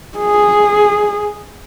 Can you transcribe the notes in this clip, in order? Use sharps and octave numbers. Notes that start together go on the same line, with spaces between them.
G#4